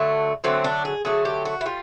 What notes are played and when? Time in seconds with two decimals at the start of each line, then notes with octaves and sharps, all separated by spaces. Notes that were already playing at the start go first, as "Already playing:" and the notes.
Already playing: D3 F#3 A3
0.44 D3 F#3 A3 C4
0.64 D4
0.85 G#4
1.05 D3 F#3 A3 G#4
1.25 G4
1.45 F#4
1.61 E4
1.66 G3 F4